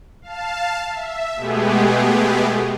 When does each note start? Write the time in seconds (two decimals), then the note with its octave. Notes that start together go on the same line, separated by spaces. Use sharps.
0.22 F5 A5
0.89 E5
1.36 B2 G#3 A3 B3 G4 G#4